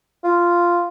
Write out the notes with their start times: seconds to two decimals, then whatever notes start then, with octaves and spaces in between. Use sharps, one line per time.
0.24 F4